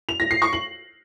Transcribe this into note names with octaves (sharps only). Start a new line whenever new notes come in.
F7
A#6
C7
C#6
F#7